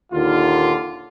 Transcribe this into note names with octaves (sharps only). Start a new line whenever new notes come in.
D#2 A#2 D3 D#3 F4